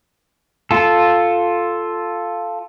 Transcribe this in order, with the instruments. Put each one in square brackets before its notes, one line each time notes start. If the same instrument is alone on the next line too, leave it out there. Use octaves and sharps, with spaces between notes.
[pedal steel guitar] F4 A4